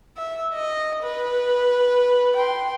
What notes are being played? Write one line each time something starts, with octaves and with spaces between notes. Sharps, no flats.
E5
D#5
B4
G5 C6